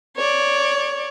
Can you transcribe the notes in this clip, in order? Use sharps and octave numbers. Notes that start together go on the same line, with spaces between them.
C#5 D5